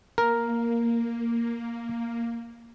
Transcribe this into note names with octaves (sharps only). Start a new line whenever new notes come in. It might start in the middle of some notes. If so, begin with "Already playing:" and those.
A#3 A#4